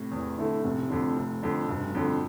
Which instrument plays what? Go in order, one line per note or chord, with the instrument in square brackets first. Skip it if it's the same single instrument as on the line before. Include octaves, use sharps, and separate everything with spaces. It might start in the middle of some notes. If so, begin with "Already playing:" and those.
Already playing: [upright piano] A2 C3
[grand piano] E2
D3 A3 E4
[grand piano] F1 [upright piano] A2 C3
[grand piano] F2 D3
F1
F2 D3
[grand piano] F1 [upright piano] G2 B2
[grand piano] F2 D3